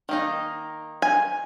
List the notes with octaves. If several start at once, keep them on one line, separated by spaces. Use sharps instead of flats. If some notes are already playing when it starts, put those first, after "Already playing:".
D#3 A#3 D#4
G#5